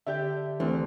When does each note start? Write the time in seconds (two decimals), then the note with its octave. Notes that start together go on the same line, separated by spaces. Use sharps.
0.07 D3 G4 E5 G6
0.60 D2 E3 C4